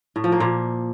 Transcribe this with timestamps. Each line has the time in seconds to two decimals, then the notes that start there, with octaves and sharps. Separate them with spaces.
0.16 A2
0.24 F3
0.32 A#3
0.40 A#2